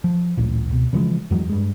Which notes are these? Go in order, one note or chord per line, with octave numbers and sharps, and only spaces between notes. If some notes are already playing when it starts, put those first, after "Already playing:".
F3
D1 A1 A#2
C#2 B2
C#3 E3 F3 G#3
F2 E3 F#3 G#3
G2 G#3